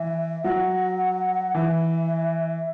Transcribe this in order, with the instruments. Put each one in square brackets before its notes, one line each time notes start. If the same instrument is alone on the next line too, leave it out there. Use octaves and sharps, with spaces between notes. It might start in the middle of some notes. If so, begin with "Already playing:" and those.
Already playing: [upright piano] E3 [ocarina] E5
[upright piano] F#3 [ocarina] F#5
[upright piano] E3 [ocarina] E5